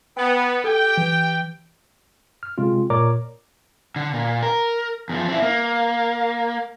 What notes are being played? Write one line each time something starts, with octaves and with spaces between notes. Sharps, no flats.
B3 G5
G4 A4 G5
E3
F6
C3 G#3 C4 F4
A#2 A#4 C#5 D5 A#5 D6
D3
A#2
A#4
E2 F3
C4 E4
A#3